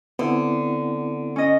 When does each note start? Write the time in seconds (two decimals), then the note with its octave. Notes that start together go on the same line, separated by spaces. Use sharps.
0.19 D3 B3 C4 E4
1.36 C#4 D#5